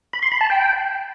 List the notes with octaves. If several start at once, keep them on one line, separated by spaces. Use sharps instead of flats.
B5
C6
B5
A5
G5